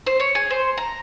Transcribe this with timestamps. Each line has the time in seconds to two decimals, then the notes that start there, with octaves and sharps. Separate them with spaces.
0.07 C5
0.20 C#5
0.35 G#4
0.50 C5
0.77 A#5